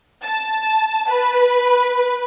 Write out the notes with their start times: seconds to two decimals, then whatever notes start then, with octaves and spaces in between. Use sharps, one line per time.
0.24 A5
1.10 B4